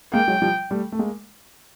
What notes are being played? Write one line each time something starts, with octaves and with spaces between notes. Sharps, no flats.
G#3 A#3 G5
F#3 G#3
F3 G3
G3 A3
A3
G#3 A#3